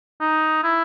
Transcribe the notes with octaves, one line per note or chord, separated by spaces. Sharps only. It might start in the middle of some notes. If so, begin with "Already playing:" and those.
D#4
E4